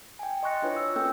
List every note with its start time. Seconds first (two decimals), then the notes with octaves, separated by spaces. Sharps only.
0.19 G5 G#5
0.43 D#5 C6 C#6 F#6 A#6 C#7
0.62 D4 E4 F4 B4 C#5
0.76 E6
0.96 A#3 C#4 F4 A4 G5 E6